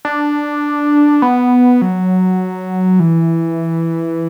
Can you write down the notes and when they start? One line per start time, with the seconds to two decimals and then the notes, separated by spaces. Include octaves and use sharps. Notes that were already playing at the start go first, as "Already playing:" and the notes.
0.05 D4
1.22 B3
1.82 F#3
3.00 E3